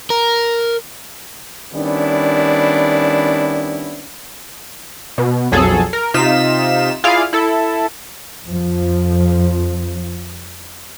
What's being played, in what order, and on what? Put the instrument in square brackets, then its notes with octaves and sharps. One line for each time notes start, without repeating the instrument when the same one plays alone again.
[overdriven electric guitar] A#4
[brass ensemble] D#3 G3 B3 C#4 D4 E4
[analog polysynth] B2
B1 F2 F#3 G#4 A4
A#4
C3 D#4 F4 B6 E7
E4 F4 G#4 D5 F5
E4 A4
[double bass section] F2 F3